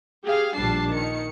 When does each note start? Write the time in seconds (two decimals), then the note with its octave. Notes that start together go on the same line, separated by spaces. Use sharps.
0.24 G4 G#4 F5
0.54 A#1 G3 D4 A5 C7
0.92 D#3 C#7